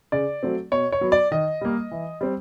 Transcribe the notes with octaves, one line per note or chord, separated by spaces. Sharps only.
C#3 D5
F#3 A3 C4
B2 C#5
C#5
F#3 B3
D5
D#3 D#5
G3 A#3
E3
G3 C4